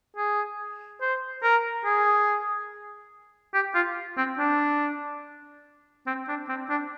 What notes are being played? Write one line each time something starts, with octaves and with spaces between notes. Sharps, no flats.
G#4
C5
A#4
G#4
G4
F4
C4
D4
C4
D4
C4
D4